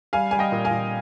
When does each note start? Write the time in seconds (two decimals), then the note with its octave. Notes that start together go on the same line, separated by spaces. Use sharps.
0.13 G3 F5 G#5
0.31 G3 G#5
0.39 D#5 G5
0.52 A#2
0.65 F5 G#5
0.71 A#2